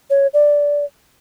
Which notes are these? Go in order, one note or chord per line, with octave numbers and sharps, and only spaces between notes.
C#5
D5